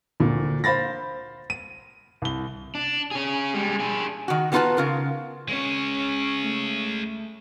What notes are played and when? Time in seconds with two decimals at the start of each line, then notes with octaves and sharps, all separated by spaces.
0.20 D2 A#2
0.64 C5 F5 B5 A6 A#6
1.50 D#7
2.22 C2 G7
2.75 D4
3.11 C#4 G#4
3.54 G3 G#3
3.80 D4 G#4
4.28 D#3 F#4
4.52 G3 B3 D#4 F4 B4 A5
4.77 C#3 F4 A#4
5.49 G#3 C#4 C#5
6.43 A3